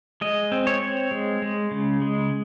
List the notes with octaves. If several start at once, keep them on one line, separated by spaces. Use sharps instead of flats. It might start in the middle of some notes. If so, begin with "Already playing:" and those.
G#3 D#5
C4
C#5
C4
G#3
G#3
C#3
G#3